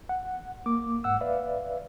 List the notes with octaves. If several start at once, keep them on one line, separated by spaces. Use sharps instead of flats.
F#5
A#3 D6
G#2 F#5 E6
B4 D5 E5 F5